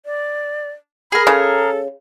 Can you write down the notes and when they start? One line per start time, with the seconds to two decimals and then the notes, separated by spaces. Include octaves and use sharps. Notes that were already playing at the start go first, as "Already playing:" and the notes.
0.06 D5
1.12 G#4 A#4 B5
1.27 C#3 A4